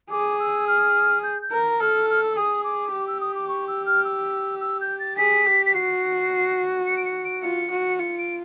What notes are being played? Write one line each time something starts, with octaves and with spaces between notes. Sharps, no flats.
G#4 D6
E6
F6
G6
G6
A#4
A4 F6
F6
E6
G#4 D#6
D6
G4
E6
D#6
D6
C#6
E6
F6
E6
E6
G6
A6
G#4 B6
G4
B6
F#4 C7
C#7
D7
C#7
D7
F4 C#7
F#4
F4 C#7
D7